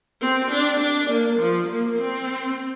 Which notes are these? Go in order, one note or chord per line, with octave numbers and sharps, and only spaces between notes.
C4
D4
D4
A#3
F3
A#3
C4